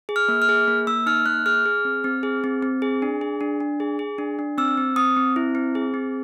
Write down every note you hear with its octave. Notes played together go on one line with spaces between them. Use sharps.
G#4
F6
A#3
F6
G#4
A#3
A#3 E6
D#4 F6
A#3 F#6
G#4 F6
G#4
C4
C4
G#4
C4
C4
G#4
D4
G#4
D4
D4
G#4
G#4
D4
D4
C4 E6
C4
C4 D#6
C4
E4
C4
G#4
C4